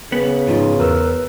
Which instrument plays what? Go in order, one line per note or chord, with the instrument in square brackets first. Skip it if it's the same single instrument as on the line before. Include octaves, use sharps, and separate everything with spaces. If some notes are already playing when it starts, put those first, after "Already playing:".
[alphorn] C#3 [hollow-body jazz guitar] B3
[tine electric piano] G#2 F3 D#4 [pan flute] F4
[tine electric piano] E2 A#4 E6 [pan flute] B4